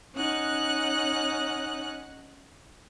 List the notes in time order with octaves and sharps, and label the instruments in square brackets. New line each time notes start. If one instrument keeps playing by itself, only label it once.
[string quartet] C#4 D#4 F#5 F#6